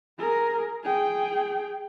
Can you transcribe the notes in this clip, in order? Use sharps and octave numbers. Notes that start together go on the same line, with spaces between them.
G#4 A#4
G#4 G5